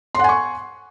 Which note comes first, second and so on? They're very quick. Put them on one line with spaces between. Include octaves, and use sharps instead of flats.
C6 F#5 G#5 C#6